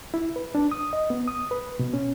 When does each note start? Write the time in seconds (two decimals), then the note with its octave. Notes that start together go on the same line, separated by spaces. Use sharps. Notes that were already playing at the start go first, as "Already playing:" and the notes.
0.14 E4
0.36 B4
0.55 D4
0.71 D#6
0.93 D#5
1.10 B3
1.28 D#6
1.51 B4
1.79 B2
1.94 C#4